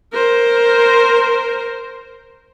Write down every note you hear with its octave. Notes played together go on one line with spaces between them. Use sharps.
A#4 C5